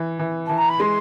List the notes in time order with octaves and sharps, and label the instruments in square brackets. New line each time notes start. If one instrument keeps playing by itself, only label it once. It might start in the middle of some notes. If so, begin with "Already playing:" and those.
Already playing: [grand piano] E3
E3
[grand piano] E3 [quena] A5
[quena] A#5
B5
[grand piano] G#3 [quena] C6